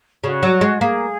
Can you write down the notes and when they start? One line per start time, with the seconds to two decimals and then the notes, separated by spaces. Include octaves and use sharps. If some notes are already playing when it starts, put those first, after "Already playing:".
0.24 C#3 F#4
0.43 F#3
0.61 G#3
0.80 A#3 G#4